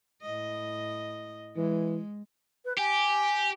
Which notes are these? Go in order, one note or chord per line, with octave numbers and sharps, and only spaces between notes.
A2 D#5
E3 G#3
B4
G4 G#5